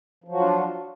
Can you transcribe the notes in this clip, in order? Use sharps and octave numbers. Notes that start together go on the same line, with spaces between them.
F3 F#3 D4 F4 F#4